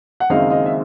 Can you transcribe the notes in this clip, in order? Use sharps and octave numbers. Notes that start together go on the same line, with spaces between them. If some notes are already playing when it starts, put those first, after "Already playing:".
F#5
F#1 F#2 D#3 G#3 C4 D#5 F5
D#5 F5
E5